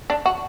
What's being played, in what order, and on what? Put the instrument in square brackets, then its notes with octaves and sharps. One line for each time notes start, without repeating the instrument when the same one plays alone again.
[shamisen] D4
F#4